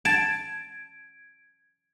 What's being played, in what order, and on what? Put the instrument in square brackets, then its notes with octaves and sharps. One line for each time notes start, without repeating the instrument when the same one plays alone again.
[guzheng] A5 [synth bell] G#6 D7